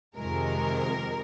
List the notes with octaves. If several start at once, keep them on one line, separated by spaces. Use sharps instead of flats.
F2 C3 D#3 G#3 A#4